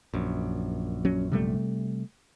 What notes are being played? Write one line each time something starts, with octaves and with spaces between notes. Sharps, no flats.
A#1 F#2
F#3 C#4
C3 G3 A3